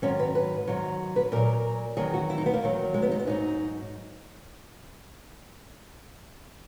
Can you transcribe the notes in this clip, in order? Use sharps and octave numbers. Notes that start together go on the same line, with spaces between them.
G#2 D#3 F#3 C#4
B4
B4
G#2 D#3 F#3
B4
A#2 F#3 A#4
E2 D#3 F#3 G#4
F#4
E4
D#4
B3
A#3
E2 D#3 F#3
G#3
B3
D#4
B3
G#2 F#3 D#4